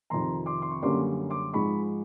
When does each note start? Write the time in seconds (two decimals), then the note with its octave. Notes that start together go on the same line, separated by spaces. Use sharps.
0.10 F2 C3 D#3 A#5 C6
0.46 C6 D6
0.62 C6
0.71 C#6
0.82 F#2 D3 G3 A#3 C#4 C6 D6
1.30 C6 D6
1.53 G#2 F3 G#3 B5 C#6